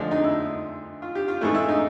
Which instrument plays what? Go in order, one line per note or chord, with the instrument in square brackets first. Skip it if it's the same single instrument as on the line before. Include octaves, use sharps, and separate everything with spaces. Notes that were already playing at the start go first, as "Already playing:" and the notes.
Already playing: [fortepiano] D2 D3 F3 G#3 D4
D#4
E4
F4
G4
F4
G#2 E3 A3 E4
E4
D#4